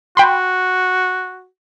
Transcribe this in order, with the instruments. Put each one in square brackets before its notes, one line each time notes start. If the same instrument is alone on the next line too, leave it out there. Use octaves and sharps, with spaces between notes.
[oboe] F#4 [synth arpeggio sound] G5 B5 C6